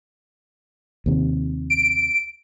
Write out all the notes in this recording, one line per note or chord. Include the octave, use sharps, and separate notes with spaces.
D#2 C3
D7